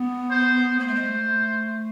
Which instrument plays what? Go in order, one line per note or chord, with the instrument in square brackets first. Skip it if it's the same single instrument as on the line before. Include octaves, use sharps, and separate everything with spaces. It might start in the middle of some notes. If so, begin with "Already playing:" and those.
Already playing: [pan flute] B3
[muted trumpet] C5
[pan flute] A#3 [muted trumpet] C5
[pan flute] A3
G#3
A3